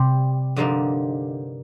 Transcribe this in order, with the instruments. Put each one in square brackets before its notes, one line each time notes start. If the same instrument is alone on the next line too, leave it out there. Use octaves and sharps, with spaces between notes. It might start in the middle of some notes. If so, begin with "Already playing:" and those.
Already playing: [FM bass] C3 [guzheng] G3 C4 G4
[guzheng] G2 D3 F3 A#3 D#4